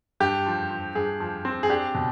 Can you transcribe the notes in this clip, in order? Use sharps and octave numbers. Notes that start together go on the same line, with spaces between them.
G2 G4
F3
F3
G2 G#4
F3
C4
G#4
D4 G4
B2